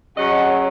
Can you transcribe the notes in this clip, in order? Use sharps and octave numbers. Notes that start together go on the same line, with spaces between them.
C#3 F#3 C#4 D#5 F#5